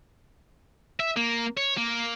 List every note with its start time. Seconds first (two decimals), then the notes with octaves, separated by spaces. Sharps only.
1.00 E5
1.17 A#3
1.57 C#5
1.77 A#3